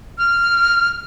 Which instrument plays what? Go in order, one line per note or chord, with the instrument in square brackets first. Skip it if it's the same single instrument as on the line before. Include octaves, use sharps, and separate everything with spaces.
[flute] F6